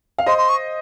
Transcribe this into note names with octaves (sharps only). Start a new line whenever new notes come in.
F5
C5 D#5 C6
C6
C#6